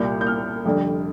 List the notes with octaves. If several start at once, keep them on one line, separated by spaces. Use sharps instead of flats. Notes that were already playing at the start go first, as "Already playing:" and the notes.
Already playing: C2 A#2 G3 G6
G6
F6
F1 F2 D3 G3